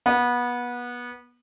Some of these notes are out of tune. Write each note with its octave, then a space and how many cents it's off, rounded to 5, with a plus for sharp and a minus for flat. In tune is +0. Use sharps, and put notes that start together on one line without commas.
B3 -25